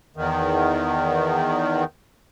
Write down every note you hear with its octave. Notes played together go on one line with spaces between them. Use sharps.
E2 D#3